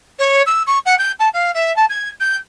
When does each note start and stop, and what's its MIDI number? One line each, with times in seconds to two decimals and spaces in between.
0.19 0.42 73
0.46 0.63 88
0.66 0.79 85
0.85 0.95 78
0.98 1.12 91
1.19 1.29 81
1.33 1.51 77
1.54 1.75 76
1.76 1.85 81
1.89 2.09 92
2.20 2.36 91